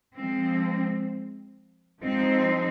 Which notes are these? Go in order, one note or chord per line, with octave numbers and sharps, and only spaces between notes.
F3 G#3 C4
F3 G#3 C4 D#4 C5